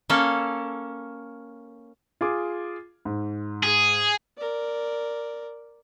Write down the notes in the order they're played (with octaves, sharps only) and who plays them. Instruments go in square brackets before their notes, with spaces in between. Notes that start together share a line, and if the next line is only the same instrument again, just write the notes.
[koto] A#3 C#4 A4
[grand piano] F4 G#4 D6
G#2
[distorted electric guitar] G#4
[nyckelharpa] A#4 D5